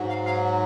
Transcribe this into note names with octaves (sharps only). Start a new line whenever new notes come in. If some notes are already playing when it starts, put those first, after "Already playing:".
Already playing: G#2 F#3
F5
F5